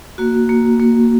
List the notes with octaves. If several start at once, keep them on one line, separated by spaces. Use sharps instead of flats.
A#3 F#4
A#3
A#3